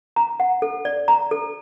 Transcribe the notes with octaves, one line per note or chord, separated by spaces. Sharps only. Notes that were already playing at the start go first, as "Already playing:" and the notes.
A#5
F#5
A4
D5
A#5
A4